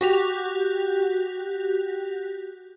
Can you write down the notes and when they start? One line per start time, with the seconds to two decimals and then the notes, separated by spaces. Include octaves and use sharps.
0.01 F#4 G4 F7